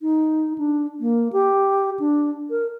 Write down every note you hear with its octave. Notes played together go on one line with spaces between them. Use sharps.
D#4
D4
A#3
G4
D4
A#4